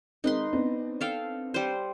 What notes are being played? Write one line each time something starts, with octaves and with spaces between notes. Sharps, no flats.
D#3 G#3 C4 D#4 B4 C6
B3 C4 D4
A4 F5 G5
G3 C5